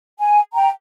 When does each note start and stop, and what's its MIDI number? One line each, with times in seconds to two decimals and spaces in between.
0.19 0.40 80
0.54 0.69 79
0.54 0.69 82